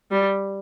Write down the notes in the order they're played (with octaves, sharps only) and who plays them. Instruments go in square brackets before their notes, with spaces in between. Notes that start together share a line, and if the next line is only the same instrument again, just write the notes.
[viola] G3